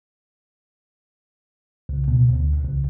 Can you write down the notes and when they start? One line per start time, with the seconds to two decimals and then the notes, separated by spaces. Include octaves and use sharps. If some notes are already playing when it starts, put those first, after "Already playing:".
1.89 C#2
2.08 B2
2.29 D2
2.65 C#2